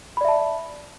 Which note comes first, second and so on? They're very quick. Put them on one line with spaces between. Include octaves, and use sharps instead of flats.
B5 D5 E5 A5